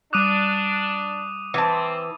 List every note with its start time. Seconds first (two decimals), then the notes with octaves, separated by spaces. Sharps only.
0.13 G3 D4 D6 D#6 F#6 D#7
1.54 E3 C4 A5